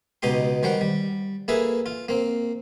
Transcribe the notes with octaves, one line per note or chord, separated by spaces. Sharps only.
C#2 B2 D#4 G4 C6
D#3 G3 C5 F#5 G5
G3
A#3 E4 G#4 A4 B4
F4
A#3 C4